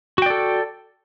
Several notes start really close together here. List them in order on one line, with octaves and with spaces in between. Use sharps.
F#4 G5 D5 A4